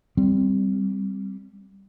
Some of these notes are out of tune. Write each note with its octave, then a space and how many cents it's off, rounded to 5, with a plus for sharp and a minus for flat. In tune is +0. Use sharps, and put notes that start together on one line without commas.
G3 +0 C4 +0